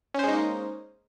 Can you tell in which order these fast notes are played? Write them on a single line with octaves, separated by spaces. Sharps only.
C#4 C5 G#3 D#4 A#3